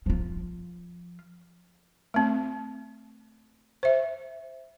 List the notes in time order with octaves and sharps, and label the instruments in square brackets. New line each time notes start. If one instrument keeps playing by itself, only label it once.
[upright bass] F3 F4
[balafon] A3 C4
C5 E5